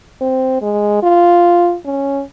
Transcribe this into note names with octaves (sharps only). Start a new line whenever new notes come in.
C4
G#3
F4
C#4